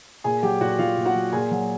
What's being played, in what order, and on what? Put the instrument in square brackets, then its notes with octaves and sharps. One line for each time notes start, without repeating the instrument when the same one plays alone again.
[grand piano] A#2 G#4 G#5
F#3 G4 G5
A#2 F#4 F#5
F#3 F4 F5
A#2
F#4 F#5
F#3
A#2 G#4 G#5
F#3